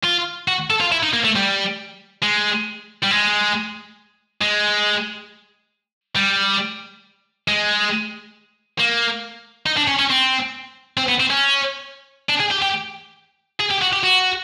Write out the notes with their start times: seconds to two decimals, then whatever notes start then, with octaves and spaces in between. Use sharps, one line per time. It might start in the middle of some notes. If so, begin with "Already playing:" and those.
0.04 F4
0.48 F#4
0.70 A4
0.80 F4
0.92 E4
1.03 D#4
1.13 A#3
1.25 A3
1.36 G3
2.23 G#3
3.03 G3
3.11 G#3
4.42 G#3
6.16 G3
7.48 G#3
8.79 A#3
9.66 D#4
9.77 D4
9.88 C#4
9.99 C#4
10.10 C4
10.97 C4
11.09 B3
11.20 C4
11.30 C#4
12.29 D4
12.40 G#4
12.51 G4
12.62 G4
13.60 G#4
13.71 G4
13.82 F#4
13.93 G4
14.04 F#4